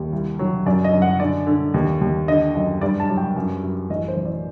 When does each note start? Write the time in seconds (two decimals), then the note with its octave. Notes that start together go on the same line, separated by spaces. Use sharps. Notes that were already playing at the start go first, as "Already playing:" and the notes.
Already playing: D#2
0.12 C2
0.39 F#3
0.66 F#2 D5
0.84 D#5
0.93 F#2
1.02 F#5
1.20 D3 D5
1.46 D3
1.74 D#2
2.01 D#2
2.28 D3 D#5
2.55 F#2 D#5
2.81 G2 D5
3.00 A5
3.09 F#3
3.18 G5
3.36 F#2
3.63 F#2
3.90 A1 D#5
4.08 C5
4.17 A1
4.25 D5